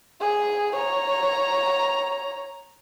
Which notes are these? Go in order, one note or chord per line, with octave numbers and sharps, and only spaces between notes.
G#4
C#5 A#5